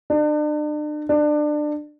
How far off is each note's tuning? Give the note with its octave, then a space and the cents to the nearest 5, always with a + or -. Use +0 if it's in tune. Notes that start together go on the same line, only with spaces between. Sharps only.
D4 +40
D4 +25